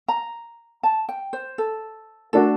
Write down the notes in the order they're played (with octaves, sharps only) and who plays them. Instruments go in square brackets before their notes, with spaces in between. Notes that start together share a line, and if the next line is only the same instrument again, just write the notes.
[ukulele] A#5
A5
G5
C5
A4
[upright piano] A3 D4 F#4 [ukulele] A4